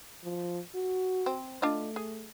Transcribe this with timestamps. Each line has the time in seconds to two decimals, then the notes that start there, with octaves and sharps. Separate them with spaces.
0.24 F3
0.75 F#4
1.26 C4
1.62 A3 D4 F4 D#5
1.96 G#4